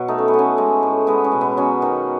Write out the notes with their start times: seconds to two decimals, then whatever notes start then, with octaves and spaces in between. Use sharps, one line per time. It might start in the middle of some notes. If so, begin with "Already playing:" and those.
Already playing: B2 F#3 B3 C#5
0.08 A3 D#4
0.18 C#4
0.28 B3
0.34 A3
0.39 C#4
0.58 G#3
0.83 A2
1.07 G#3 B3
1.24 C#4
1.32 B2
1.41 B3
1.57 F#3 C#4
1.82 D#3